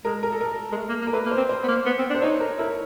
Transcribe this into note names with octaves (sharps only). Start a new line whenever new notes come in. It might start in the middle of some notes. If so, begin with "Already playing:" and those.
G#3 A#4
A#4
A4
A#4
G#3
A3
A#3
A#3
A#4
A3 B4
A#3
C5
C4
C5
B3
A#3
B3
C4
D4
C5
D#4 C#5
A#4
E4 A#4